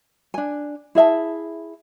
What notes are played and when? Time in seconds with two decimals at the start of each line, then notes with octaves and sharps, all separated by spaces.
0.34 D4 G#5
0.95 E4 G#4 E5 A5